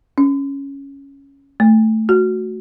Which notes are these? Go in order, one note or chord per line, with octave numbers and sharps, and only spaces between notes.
C#4
A3
F#4